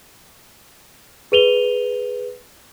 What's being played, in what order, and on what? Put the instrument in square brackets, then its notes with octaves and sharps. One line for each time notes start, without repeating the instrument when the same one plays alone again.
[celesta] G#4 B4 D#7 F7 G7